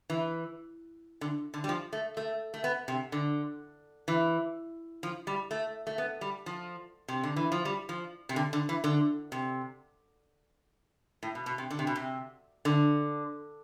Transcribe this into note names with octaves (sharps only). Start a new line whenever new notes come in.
E3
D3
D3
G3
F3
A3
A3
A3
B3
C3
D3
E3
F3
G3
A3
A3
B3
G3
F3
C3
D3
E3
F3
G3
F3
C3
D3
D3
E3
D3
C3
A2
B2
B2
C3
D3
C3
B2
C3
D3